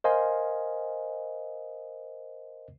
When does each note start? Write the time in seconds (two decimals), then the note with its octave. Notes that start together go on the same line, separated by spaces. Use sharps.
0.04 A#4 C5 D#5 F5 G#5 C6